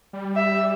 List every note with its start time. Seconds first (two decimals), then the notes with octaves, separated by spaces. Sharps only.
0.13 G3
0.36 E5